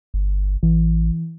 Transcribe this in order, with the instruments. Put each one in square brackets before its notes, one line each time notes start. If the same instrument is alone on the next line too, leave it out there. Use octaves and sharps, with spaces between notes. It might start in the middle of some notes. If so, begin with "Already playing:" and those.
[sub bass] G1
[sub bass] A1 [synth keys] E3